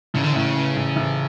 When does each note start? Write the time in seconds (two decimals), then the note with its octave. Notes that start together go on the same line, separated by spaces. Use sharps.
0.14 A1 C#3
0.23 D3
0.32 A2 C#3
0.56 E3
0.76 A1
0.96 A1